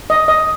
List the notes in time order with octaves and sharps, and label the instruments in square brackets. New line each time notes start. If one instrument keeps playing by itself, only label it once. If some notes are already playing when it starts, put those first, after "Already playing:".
[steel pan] D#5
D#5